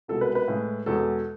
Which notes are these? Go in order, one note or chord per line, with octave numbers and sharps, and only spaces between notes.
C2 B2 G#3 A4
B4
B4
A2 G#3
E2 B2 G#3 A4